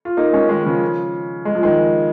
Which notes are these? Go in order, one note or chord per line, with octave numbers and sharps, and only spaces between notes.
F4
A#3 D#4
G#3 C#4
D#3 G#3
C#3 F3
G#3
F3
D#3 G#3